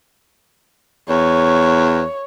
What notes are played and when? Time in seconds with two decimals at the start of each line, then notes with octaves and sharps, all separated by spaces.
1.09 E2 C#5